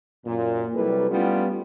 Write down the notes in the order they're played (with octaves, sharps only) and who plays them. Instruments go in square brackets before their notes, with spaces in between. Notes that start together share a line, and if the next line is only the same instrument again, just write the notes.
[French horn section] F#2 A#2
C3 F#3 G3 E4 A4 B4
G3 A3 B3 C#4 D4 F4